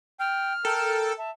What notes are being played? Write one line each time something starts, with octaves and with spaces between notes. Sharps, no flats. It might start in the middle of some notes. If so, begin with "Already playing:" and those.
G5 F6
A4 A#4 G5
E5 A5